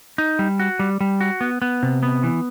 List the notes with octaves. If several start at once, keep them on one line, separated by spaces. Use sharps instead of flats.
D#4
G3
F#4
G3
G3
F#4
B3
B3
C3
B3
E3